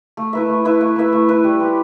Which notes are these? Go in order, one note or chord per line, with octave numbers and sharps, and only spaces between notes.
A3
E4 B4 E5
A3
E4 B4 E5
A3
E4 B4 E5
A3
E4 B4 E5
G3
C4 G4